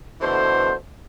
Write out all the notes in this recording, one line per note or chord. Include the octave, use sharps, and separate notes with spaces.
B2 D3 E3 A3 C5